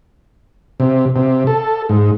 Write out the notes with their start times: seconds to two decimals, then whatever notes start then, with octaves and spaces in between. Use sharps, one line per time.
0.80 C3
1.16 C3
1.47 A4
1.89 G#2